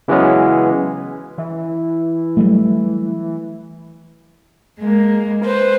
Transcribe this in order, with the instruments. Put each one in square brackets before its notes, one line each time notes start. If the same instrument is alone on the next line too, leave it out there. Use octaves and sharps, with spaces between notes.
[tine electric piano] C#3 E3 F#3 G#3 B3 C#4
[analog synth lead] E3
[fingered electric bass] F#3 G3 A3
[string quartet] G#3 A#3
B4 C5